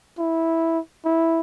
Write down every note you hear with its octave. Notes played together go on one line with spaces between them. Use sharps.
E4
E4